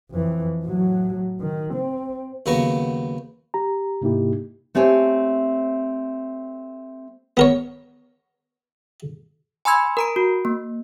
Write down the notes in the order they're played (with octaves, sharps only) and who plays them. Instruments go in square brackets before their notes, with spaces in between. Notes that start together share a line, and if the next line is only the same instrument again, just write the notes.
[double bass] F2 E3
A2 F#3
D#3
C4
[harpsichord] D#2 C#3 F#3 B3 A#5 C#6
[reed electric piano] G4 A#5
G#2 C3 A#3 D#4 E4 G4
[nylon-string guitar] A3 C4 G4 C#5 G#5
[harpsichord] B3 A#4 C#5
[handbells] G#5 B5 C6 E6 G#6
A#4 A#5 D7
F#4
A#3